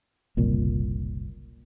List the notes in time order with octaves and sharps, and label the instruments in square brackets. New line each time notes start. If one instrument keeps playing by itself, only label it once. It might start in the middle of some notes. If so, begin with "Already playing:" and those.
[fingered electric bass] F#1 C2 A#2